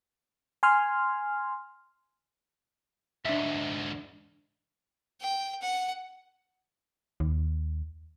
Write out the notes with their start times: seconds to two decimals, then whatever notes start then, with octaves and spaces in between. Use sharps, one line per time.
0.63 G#5 C6 F6
3.25 D2 G#2 D4 E5
5.21 G5
5.62 F#5
7.20 D#2